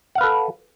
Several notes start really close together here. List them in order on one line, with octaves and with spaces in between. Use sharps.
F#5 F5 B4 A4